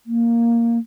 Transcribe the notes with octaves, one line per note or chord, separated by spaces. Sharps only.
A#3